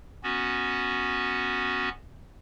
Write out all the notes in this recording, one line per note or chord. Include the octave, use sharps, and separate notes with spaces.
B3 C#4 F#4